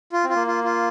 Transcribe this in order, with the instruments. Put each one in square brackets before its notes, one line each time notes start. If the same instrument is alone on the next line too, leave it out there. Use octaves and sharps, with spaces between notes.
[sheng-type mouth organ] F4
[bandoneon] C4
[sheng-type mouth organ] F4
[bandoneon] A#3
[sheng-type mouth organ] F4
F4